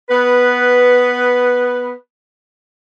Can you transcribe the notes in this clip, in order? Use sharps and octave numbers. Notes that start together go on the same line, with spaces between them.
B3 B4